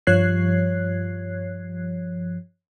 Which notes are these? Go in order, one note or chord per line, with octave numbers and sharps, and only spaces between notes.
G2 F3 C#5 F#6 G#6 C7